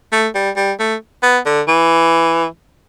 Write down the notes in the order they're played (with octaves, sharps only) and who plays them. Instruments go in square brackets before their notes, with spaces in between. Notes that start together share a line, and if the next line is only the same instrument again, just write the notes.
[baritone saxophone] A3
G3
G3
A3
B3
D3
E3